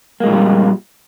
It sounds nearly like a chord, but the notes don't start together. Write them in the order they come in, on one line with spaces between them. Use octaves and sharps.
A#3 G#3 A#2 F2 G3